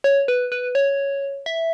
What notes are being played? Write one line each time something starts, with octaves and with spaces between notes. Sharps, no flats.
C#5
B4
B4
C#5
E5